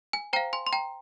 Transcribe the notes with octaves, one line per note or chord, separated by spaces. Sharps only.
G#5
C5 F5 G5 A#5
G#5 C6
C6
G5 A#5